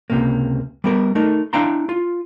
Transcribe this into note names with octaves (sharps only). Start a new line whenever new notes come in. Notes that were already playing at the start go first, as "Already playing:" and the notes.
C#2 C3 A#3
G3 B3 A#4
A3 D#4 A#4
D4 E4 F5 G5 A#5 C6
F4